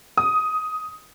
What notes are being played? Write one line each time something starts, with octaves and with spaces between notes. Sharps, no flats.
D#6